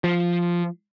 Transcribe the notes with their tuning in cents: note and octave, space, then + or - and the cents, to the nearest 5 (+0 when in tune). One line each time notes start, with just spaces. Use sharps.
F3 -5